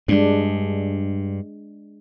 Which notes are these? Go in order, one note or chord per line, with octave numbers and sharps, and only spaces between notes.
G2 G#3 D4